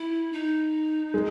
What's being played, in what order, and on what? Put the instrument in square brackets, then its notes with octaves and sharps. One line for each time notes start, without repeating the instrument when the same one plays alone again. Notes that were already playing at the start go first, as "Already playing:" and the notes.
Already playing: [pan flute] E4
D#4
[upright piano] G#3